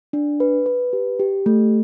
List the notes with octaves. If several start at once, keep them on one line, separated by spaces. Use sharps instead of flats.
D4
B4
B4
G4
G4
A3